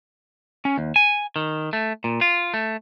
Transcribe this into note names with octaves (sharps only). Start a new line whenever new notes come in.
C#4
D#2
G#5
D#3
A3
A#2
F4
A3